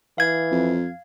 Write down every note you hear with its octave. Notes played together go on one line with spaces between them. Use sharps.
E3 F5 G#6
F2